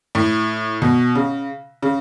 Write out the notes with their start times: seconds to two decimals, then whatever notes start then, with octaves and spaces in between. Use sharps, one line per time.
0.15 A2
0.82 B2
1.15 C#3
1.83 C#3